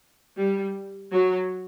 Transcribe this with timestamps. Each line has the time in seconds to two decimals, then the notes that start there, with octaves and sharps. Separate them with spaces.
0.37 G3
1.12 F#3